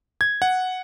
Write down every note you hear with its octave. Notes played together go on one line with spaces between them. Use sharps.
G#6
F#5